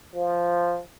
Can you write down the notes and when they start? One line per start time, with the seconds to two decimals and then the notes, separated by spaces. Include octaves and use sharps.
0.15 F3